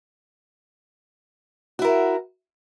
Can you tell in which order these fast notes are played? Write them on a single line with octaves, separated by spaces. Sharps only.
F#4 E4 A#4